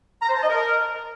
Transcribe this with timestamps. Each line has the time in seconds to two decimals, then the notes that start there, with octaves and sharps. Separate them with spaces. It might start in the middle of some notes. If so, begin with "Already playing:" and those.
0.22 A#5
0.29 C5
0.36 A5
0.43 D#5
0.50 A#4